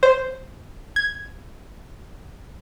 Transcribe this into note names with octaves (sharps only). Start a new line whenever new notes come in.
C5
G#6